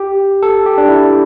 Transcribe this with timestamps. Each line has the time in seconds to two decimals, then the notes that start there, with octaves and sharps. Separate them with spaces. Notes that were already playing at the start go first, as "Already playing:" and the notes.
Already playing: G4
0.43 A4
0.66 G4
0.78 D4
0.88 E4